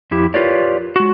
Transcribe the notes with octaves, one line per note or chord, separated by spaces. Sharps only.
F2 E4 G4
F4 G4 A#4 B4 C#5 D5
G#3 F#4